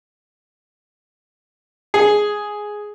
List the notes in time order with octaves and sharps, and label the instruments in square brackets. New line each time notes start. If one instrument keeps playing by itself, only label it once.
[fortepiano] G#4